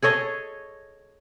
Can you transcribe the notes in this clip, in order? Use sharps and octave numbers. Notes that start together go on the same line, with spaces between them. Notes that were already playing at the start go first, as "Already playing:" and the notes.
G#4 A4 C#5 D#5